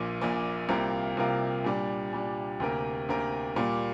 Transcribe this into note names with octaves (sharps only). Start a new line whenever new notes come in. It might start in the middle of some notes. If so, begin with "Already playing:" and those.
Already playing: A#1 A#2 A#3
A#1 A#2 A#3
C2 C3 A#3 F4 A#4
C2 C3 A#3 F4 A#4
A#2 G3 D4
A#2 G3 D4
D2 C3 A#3 G4 A#4
D2 C3 A#3 G4 A#4
A#2 G3 A#3